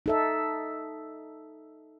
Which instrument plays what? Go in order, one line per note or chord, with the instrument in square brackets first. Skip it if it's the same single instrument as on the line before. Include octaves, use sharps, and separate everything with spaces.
[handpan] D#4 A4 E5